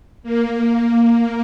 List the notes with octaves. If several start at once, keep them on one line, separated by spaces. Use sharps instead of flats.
A#3